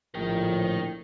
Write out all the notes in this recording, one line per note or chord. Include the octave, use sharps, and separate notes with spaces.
A#1 A2 A#4 G5